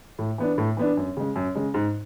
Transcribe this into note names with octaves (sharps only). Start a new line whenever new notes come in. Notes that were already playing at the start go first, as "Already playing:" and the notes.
A2
E3 B3 D4
A2
E3 B3 D4
F#2
C#3 G#3
F#2
C#3 G#3
G#2